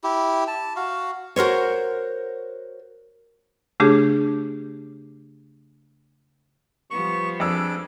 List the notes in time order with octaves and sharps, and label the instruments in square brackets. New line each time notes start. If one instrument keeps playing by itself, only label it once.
[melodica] E4 G4
A5
F#4 F5
[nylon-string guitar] F#4 A#4 C5 C#5
[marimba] C#3 A3 D4 G4 G#4
[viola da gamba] F3 G3 B3 [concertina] C#6
[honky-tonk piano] F2 E6 [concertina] D4 G#4 D6